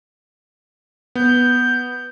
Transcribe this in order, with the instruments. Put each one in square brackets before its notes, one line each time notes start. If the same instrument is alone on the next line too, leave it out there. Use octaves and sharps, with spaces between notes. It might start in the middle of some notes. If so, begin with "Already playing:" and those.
[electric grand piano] B3 [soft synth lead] G6